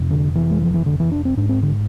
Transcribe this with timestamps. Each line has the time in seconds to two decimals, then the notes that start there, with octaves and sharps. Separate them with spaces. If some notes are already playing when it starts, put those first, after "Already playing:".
Already playing: F2 C3
0.11 D3
0.35 E3
0.51 G#3
0.62 F3
0.74 E3
0.86 D3
1.00 E3
1.12 D4
1.25 C4
1.37 G#2 D4
1.49 C4
1.62 D3